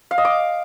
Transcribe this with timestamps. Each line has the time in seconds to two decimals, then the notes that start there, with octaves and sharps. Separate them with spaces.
0.11 F5
0.18 D#5
0.25 D6